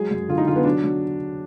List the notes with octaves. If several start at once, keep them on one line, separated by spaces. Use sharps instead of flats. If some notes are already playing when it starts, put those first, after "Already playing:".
Already playing: F#3 G#3 G#4
F#2
D3 F4
D#4
D3 F4
B3
F#3 D4
F#3